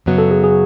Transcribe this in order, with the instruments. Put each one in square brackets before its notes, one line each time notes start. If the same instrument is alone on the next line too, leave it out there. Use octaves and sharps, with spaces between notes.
[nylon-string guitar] F#2 C#3 F#3 B3
[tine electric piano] A4
G#4
G#4